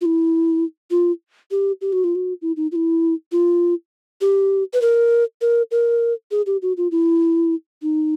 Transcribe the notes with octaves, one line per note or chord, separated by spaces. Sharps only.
F4
E4
F4
G4
G4
F#4
F4
F#4
E4
D#4
F4
E4
F4
G4
B4
A#4
A#4
A#4
G#4
G4
F#4
F4
E4
D#4